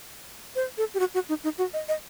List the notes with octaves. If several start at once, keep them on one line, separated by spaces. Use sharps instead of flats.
C5
A4
G4
F#4
F#4
D#4
D#4
F#4
D#5
D#5